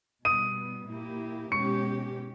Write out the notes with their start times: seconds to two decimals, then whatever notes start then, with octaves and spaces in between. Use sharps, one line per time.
0.25 B2 G3 B3 D#6 D#7
0.89 A#2 A#3 E4 G4
1.51 B2 G#3 C#4 G4 C#6 C#7